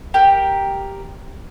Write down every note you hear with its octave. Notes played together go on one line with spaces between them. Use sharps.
G4 A#4